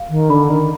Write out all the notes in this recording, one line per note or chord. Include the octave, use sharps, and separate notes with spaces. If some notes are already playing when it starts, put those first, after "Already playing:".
Already playing: F5
D#3
D3 B5
D#3